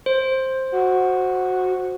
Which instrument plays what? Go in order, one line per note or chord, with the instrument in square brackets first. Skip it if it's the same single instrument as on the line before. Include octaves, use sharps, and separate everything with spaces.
[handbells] C5
[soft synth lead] F#4